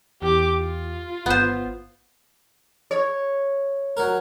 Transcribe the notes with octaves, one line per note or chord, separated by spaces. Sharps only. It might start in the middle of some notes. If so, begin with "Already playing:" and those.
E2 G4 D6
F4
G1 B3 C5
C#5
F#3 A#4